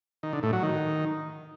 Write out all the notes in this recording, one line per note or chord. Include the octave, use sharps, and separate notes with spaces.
D#3
D3
A2
F#3
D#3